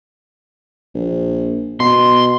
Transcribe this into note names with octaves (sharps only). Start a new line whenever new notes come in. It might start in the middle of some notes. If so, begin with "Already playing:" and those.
A#1
B2 C6